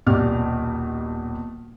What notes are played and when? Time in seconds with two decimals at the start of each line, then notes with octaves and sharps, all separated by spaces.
0.06 D#1 B1 G4 D5 F6